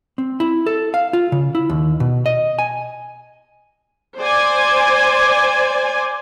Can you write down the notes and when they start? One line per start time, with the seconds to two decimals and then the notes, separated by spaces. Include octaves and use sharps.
0.18 C4
0.40 E4
0.66 A4
0.94 F5
1.13 F4
1.32 C#3
1.55 E4
1.69 D#2
2.00 B2
2.26 D#5
2.59 G#5
4.18 C5 D5 G#5